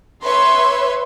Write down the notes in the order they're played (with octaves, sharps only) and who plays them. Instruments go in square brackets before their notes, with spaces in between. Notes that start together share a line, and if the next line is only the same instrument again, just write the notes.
[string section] B4 C#5 E5 [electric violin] C6